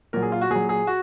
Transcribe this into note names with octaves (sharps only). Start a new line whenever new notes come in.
A#2 F#3 A#4
G#4
F4
F#4
A#2 F#3 G#4
G#4
F#4